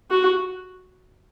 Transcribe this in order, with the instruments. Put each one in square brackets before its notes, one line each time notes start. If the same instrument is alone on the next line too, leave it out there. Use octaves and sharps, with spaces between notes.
[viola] F#4